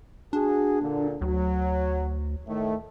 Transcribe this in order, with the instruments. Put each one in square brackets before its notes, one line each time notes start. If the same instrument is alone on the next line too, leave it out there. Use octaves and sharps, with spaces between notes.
[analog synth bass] D4 [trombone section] F#4 G#4
[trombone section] A#2 D3
[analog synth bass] D2 [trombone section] F#3
[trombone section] A2 D#3 A3